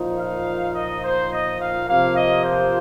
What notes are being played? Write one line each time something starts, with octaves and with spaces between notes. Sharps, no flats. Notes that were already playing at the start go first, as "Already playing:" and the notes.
Already playing: A#2 F3 D#4
F5
D#5
C5
D#5
F5
C3 F3 A#3 F5
D#5
C5